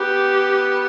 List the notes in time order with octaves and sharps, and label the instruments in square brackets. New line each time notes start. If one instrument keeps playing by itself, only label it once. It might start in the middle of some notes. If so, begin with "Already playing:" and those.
Already playing: [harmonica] B3 [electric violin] G4